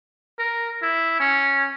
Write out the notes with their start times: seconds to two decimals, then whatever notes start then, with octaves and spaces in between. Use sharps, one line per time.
0.39 A#4
0.82 E4
1.20 C#4